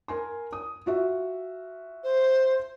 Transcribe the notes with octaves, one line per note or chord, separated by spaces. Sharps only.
A#4 G#5 C6
D#6
F4 F#4 E5
C5